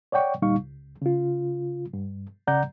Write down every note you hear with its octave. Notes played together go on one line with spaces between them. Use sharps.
C#5 D5 F#5 G5 C#6
D2 A#2 G3 D#4 F5 C#6
C#2
C#3 F4
G2
C2 C#3 D5 F#5 A#5 G6